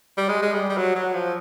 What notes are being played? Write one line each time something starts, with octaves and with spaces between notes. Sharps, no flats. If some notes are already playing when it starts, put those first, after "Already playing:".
G3
G#3
G#3
G3
G3
F#3
F#3
F3